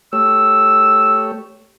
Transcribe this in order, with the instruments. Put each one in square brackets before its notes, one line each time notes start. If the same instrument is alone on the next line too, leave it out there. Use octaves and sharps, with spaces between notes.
[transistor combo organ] A3 G4 C#5 [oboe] E6